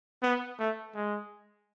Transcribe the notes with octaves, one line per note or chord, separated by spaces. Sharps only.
B3
A3
G#3